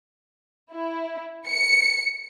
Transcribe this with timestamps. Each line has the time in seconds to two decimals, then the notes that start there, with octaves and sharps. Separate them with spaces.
0.73 E4
1.48 C#7